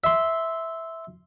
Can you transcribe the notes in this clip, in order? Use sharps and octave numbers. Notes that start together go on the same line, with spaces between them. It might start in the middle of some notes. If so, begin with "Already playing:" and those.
E5 C6